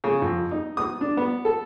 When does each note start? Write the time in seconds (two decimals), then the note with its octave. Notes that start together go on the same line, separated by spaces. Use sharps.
0.04 C#3
0.22 F2
0.51 D#4
0.77 D#6
1.01 D4
1.17 B3
1.45 A4